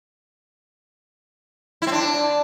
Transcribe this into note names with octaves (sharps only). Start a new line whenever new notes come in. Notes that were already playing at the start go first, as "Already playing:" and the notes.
E4
C4
D4